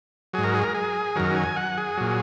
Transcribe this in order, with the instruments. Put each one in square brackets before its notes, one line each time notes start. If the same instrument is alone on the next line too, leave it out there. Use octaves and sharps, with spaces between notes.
[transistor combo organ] G#2 F#3 G#4
A#4
G#4
A#4
G#4
F#2 D#3 F#3 A#4
G#5
F#5
G#4
A#2 F#3